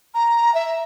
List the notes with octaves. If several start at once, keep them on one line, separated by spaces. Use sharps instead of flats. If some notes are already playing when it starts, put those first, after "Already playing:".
A#5
E5